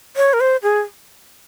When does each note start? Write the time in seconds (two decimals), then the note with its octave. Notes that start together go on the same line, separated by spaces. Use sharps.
0.17 C#5
0.33 A#4
0.40 C5
0.63 G#4